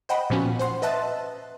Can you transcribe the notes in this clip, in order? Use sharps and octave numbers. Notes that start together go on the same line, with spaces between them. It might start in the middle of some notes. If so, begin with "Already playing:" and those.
C5 D#5 F#5 G5 B5
A#2 F3 B3 C#4 F#4
C5 F#5 C6
B4 D#5 E5 A5 F#6 A6